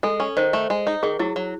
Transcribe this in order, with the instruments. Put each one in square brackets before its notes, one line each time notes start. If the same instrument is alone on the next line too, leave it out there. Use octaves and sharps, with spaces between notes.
[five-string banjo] G#3 [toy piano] A4
[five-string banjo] C#4
[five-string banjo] D#3 [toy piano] C5
[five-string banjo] A3
G#3
D#4
[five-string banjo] D#3 [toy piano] G#4
[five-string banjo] F#3 [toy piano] E4
[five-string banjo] F#3